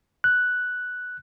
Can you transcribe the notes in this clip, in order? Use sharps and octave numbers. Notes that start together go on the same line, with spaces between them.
F#6